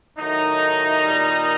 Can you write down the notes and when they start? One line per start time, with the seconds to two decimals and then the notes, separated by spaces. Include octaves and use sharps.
0.19 A2 D#3 F#3 A3 D#4
1.03 A#2 G3